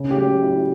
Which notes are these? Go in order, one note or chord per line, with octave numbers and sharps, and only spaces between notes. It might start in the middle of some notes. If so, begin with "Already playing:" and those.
Already playing: C#3
G4
F#3
E4